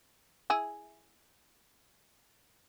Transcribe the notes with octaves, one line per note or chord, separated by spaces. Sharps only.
E4 G#4